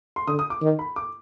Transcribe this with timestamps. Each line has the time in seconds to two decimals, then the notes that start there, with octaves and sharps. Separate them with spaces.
0.16 C6
0.27 D3 D#6
0.39 D#6
0.50 D6
0.62 D#3
0.79 B5
0.96 D6